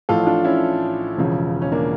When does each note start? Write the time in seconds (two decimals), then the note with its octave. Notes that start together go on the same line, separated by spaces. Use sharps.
0.09 A1 A2 F3 F4 A4
0.27 D4 F4
0.44 C#4 E4
1.17 E1 E2 C#3 F3
1.62 C#4
1.72 A#3 D4